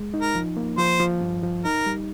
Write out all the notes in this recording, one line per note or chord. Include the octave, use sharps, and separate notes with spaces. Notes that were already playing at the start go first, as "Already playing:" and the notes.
Already playing: G#3
D#4
A#4
F3
A#3
F3 C5
F3
G2
F3
D#4 A#4
G3